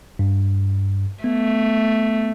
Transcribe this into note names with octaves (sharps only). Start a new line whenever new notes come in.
G2
A3 B3